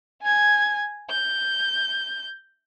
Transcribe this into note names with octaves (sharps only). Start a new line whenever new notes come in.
G#5 G#6
G6